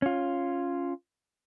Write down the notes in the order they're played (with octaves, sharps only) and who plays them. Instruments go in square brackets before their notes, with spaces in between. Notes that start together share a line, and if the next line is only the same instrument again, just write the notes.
[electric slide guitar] C#4 F4